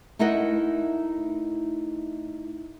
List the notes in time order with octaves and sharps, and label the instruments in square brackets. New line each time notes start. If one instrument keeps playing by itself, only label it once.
[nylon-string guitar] A3 D#4 E4 A#4 D#5 F#5